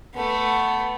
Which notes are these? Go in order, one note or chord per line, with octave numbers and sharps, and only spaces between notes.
A3 B3